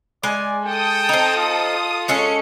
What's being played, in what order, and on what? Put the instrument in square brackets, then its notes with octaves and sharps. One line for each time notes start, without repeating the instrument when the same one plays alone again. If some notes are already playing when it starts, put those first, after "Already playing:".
[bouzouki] G#3 G#5 [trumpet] D5
[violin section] A4 D#6 [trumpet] G5
[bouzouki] C4 D#4
[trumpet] F4
[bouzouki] G#3 C#4 A4 [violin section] C#7